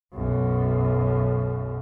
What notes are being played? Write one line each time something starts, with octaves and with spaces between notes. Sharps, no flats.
B1 F#2